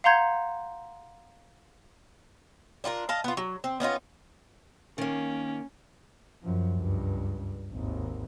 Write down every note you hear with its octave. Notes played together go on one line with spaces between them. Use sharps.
F5 F#5 A#5 C6 G6 G#6
D4 F4 G4 A#4
D#5 F5 A5
B3 F4
F#3
C4
B3 C#4 D#4 F4
D#3 A#3 C#4
F#2 F3
C#2 G2
G#1 D#2